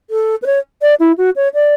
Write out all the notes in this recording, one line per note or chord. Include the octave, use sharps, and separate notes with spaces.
A4
B4
C#5
D5
E4
F#4
C#5
D5